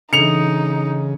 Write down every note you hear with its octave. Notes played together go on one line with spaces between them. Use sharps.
C#3 E3 D4 D#4 A4 C#7 F7